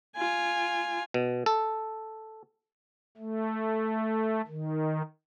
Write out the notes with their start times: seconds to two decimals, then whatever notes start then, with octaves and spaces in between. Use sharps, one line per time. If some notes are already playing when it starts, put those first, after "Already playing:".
0.16 F4 G#5
1.14 B2
1.46 A4
3.18 A3
4.47 D#3